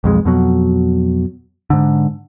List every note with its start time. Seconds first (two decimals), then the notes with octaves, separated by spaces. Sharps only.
0.04 B1 F2 G#3
0.25 F2 B2 F#3
1.70 G#2 D3